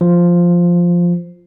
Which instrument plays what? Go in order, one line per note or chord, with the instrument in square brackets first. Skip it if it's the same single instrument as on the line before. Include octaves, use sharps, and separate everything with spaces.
[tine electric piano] F3